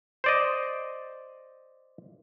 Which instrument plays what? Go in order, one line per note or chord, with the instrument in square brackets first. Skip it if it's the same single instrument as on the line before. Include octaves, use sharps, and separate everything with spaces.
[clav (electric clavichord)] C5 D5 D#5